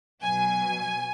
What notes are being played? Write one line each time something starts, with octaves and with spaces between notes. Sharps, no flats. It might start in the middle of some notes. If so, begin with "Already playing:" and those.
B2 F#3 G#5